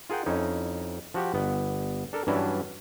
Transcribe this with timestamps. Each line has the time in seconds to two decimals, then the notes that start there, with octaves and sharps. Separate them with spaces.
0.10 F4 G#4 A#4 F#5 G5
0.26 F2 C#4 D#4 E4
1.14 F3 F#4 G4
1.34 G1 B3
2.13 D4 A4 A#4
2.27 G2 E3 F#3 C#4 D4 E4